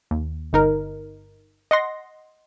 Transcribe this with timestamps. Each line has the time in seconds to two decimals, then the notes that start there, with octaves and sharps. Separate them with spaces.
0.11 D#2
0.53 G1 D#4 A#4
1.71 D#5 F#5 C6 A#6